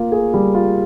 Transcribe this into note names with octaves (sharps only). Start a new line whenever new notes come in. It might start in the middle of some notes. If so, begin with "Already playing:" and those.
Already playing: A#3 F4
G#4
G3
F4